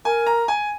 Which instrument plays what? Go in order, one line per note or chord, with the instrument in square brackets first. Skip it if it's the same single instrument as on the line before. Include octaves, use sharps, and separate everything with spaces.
[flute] A#4 [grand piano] G#5
[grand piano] A#5
G#5